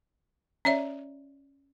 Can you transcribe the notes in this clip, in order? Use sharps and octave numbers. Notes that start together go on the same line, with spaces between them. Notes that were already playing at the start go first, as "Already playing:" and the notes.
C#4 C#5 D5 E5